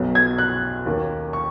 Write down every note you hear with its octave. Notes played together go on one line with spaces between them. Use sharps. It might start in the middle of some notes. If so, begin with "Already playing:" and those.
Already playing: B1 B2 F#3 B3
G#6
F#6
D#2 D#3 A#3 C#4
C#6